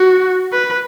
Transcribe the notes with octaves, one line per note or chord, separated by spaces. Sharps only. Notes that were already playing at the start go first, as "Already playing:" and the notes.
Already playing: F#4
B4